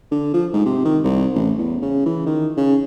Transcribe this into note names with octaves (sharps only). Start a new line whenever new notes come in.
D3
F3
G#2
C3
D#3
C2
A1
E2
C#3
E3
D#3
C#3